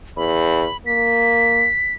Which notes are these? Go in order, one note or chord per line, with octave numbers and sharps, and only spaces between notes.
E2 B5
A#3 B6